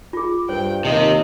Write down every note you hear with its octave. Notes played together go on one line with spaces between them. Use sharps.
F4 G#4
G2 C5 G5
D#2 C3 D#5